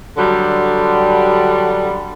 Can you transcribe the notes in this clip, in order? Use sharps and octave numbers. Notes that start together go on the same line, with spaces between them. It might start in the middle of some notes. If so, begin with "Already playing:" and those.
D3 F#3 G3